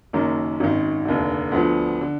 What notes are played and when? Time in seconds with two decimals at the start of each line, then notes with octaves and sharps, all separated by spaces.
0.13 F#1 F#2 D#3 A#3
0.60 G#1 F#2 D#3
1.05 F1 D#2 D3
1.52 D2 D3 F3 B3
2.01 D3